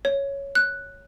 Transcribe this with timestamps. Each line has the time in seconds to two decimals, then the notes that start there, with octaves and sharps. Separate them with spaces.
0.05 C#5
0.55 F#6